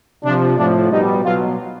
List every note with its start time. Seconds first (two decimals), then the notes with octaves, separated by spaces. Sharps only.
0.23 C3 F3 D4
0.57 A2 F3 D4
0.90 B2 G3 D#4
1.24 B2 F#3 F4